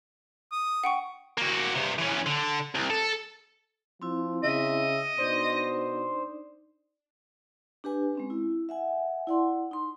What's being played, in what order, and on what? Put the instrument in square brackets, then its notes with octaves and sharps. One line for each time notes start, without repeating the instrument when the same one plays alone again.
[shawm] D#6
[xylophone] F#5 G5 C#6
[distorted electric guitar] A#3 F#4
G2 C3
E3 C#4
D3
C2
A4
[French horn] F3 [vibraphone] C4 E4
[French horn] C#3 [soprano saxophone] D#5 [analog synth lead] E5
[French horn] B2 [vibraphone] D4 D#4 D5 [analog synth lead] C5
[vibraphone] D4 G4 B4 G#5
G#3 C4 C#4
E4
E5 F#5 G#5
E4 D5 F#5 G#5 C6
D#4 C6